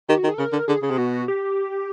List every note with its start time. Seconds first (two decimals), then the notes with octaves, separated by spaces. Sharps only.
0.09 D#3 G4
0.18 F#4
0.24 D#3
0.29 G#4
0.34 A4
0.38 C#3 A#4
0.53 D3
0.68 D3 G#4
0.82 C#3 G#4
0.90 C3
0.98 B2 F#4
1.28 G4